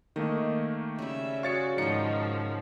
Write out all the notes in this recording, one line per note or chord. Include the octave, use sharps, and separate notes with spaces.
D#3 A3 A#3 D#5
C#3 G3 E5
F#4 G#4 C#5 F5 C#6 A6 C#7
G#2 D#3 F3 F#3 D#4 D#5 C#7